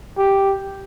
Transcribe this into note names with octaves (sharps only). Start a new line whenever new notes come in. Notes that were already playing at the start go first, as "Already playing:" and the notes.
G4